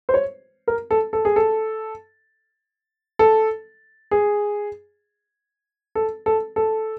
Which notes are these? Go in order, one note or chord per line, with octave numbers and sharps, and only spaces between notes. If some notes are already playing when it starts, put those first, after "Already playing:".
C5
C#5
A#4
A4
A4
G#4
A4
A4
G#4
A4
A4
A4